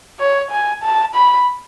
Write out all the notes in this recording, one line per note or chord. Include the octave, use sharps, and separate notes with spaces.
C#5
G#5
A5
B5